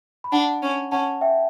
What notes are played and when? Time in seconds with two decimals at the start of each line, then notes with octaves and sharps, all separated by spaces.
0.24 B5
0.32 D4 F#5 A5
0.62 C#4
0.92 C#4 F#5 A5
1.21 E5 G5